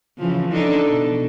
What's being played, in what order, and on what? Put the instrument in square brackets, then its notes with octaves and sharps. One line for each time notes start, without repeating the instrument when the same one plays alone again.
[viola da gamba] C#3 E3 F3
D4 D#4 A4
B2